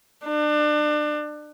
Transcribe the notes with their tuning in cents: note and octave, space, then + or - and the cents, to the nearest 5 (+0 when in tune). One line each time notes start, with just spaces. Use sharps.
D4 +30